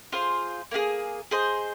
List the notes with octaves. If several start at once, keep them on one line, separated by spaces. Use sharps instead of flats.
F4 G#4 C5
A#3 F4 G#4
G#4 C5 D#5